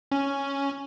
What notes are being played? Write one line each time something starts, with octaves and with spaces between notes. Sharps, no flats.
C#4